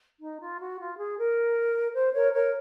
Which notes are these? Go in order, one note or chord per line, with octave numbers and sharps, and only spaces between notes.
D#4
F4
F#4
F4
G#4
A#4
C5
A#4 C#5
A#4 C#5